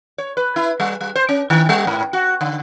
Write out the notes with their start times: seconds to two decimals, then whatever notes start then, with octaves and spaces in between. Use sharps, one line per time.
0.18 C#5
0.37 B4
0.56 E4
0.80 G3
1.01 G3
1.15 C5
1.29 C#4
1.50 D#3
1.69 G3
1.87 G#2
2.13 F#4
2.41 D3